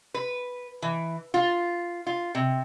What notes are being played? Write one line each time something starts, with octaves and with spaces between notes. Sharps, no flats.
B4
E3
F4
F4
C3